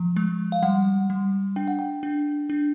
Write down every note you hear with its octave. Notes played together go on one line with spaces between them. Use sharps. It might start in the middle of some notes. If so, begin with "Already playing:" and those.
Already playing: F3
G#3
F5
G3 F#5
G3
D4 G5
F#5
G5
D4
D4